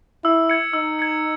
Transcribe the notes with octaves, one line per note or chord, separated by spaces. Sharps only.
E4 E6
G#6 C#7
D#4 E6
G#6 C#7